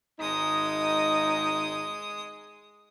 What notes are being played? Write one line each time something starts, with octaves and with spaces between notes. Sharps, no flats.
G#1 G#3 D#4 D#6